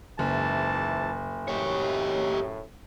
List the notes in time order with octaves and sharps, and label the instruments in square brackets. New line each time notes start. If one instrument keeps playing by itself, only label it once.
[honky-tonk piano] F#1 [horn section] G#2 E3 A5
[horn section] F#2 A2 [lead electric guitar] G4 C#5